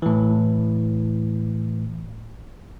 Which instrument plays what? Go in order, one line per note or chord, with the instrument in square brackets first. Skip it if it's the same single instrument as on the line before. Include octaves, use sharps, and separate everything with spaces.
[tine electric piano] A2 E3